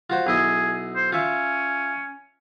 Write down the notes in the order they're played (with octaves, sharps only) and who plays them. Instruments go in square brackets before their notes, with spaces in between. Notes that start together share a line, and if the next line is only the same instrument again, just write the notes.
[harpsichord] F4 F#4 C5
[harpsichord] B1 E4 D#5 [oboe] G#4
[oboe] C5
[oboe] C#4 [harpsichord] F4 E5